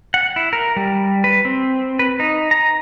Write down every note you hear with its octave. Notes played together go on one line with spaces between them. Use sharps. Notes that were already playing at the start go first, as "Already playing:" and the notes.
F#5
E4
A#4
G3
B4
C4
B4
D#4
A#5